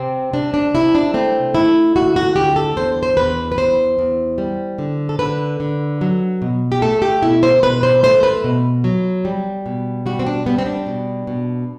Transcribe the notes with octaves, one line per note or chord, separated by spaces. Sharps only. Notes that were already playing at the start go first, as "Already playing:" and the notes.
Already playing: C3 C4
C3 D4
D4
C3 E4
D4
A3 C4
A3 E4
D2 F#4
F#4
D2 G4
A4
E2 C5
C5
E2 B4
B4
E2 C5
E2
G3
D3
A4
D3 B4
D3
F#3
B2
G4
A3 A4
G4
B2 E4
C5
B2 B4
C5
A3 C5
B4
B2
F#3
G3
B2
G3 F#4
C4
D4
G3 B3
C4
D4
B2
B2